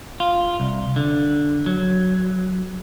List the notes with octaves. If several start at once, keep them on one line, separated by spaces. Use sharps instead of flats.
F4
C2
D3
F#3